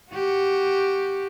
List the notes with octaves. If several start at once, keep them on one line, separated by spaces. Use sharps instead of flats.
F#4 G4